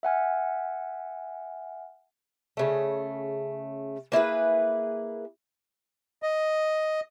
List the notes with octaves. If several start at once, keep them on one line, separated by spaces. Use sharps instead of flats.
E5 F#5 G#5 F6
C#3 A3
A#3 E4 G#4 B4
D#5